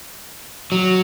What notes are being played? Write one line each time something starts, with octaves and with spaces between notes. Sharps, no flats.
F#3